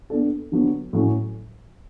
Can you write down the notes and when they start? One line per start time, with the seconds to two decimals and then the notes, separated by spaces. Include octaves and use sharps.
0.10 B3 D4 A4
0.52 D3 F#3 B3
0.93 A2 F#3 C#4